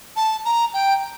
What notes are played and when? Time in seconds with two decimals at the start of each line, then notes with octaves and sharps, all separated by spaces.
0.16 A5
0.45 A#5
0.74 G5